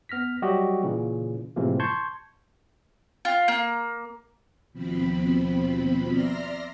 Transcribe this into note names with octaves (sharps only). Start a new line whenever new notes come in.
B3 F6 A#6 B6
F#3 G3 F#4 G4 D#5 E5
A#2 C#3 E3
A2 C3 E3 F3 G#3 A#3
A5 C6 C#6 G6 G#6
F4
A#3
D#2 B2 F3 C4 B5
D5 E5 A#5 C6 F6 A#6